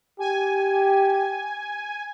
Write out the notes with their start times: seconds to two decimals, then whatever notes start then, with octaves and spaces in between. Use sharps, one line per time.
0.19 G4 G#5